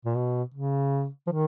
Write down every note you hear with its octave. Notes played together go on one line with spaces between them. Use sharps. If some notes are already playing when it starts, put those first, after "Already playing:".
A#2
B2
C#3
F3
D#3